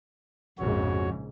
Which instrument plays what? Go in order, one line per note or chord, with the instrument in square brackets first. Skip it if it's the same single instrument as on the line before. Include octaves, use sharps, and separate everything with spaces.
[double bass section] A#1 G#2 C#3 [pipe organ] F2 F#4 C#5